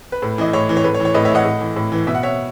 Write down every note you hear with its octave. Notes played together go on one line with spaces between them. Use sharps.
B4
A2
E3 D#5
A2 C#5
E3
C#5
A2 B4
C#5
E3
C#5
A2 B4 D#5
C#5 E5
E3 D#5 F#5
A2
E3
A2
E3
B2 E5
F#5
C#5 E5